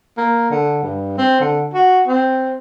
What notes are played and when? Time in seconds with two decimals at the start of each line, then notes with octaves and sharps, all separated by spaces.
0.17 A#3
0.51 D3
0.83 G2
1.18 C4
1.40 D3
1.74 F#4
2.07 C4